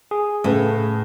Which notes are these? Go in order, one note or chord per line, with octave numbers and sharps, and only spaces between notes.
G#4
A2 C#3 A3 B4